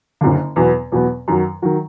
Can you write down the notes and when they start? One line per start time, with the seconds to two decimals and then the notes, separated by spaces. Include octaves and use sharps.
0.21 F#1 F#2 D3
0.56 E2 B2 F#3 B3
0.92 E2 B2 F#3 B3
1.28 F#2 D#3 F#3
1.62 D#3 F#3